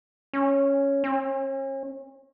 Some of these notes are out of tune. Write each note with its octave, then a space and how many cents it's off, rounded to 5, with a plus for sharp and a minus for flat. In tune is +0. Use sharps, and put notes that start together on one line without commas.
C#4 +0
C#4 -40